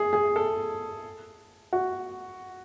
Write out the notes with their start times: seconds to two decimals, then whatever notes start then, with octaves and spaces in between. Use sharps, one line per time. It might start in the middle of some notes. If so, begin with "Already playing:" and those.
Already playing: G#4
0.13 G#4
0.36 A4
1.73 F#4